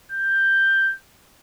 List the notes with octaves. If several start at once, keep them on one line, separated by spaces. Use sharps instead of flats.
G6